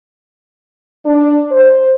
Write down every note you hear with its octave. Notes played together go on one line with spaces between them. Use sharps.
D4
C5